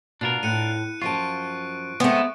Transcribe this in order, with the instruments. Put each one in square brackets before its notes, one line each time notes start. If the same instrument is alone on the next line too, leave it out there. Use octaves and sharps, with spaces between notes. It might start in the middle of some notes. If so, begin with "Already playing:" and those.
[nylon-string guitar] B2 [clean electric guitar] D4 F4 A#4
[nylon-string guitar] A2 [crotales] F#6 C#7 D#7
[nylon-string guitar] F#2 F3 A5 [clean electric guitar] F4 [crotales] C#6 D7
[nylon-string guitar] G#3 C4 [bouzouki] A3 B3